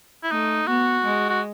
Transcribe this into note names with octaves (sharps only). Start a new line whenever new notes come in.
E4
A3 D#4
B3 F#4
G#3
F#4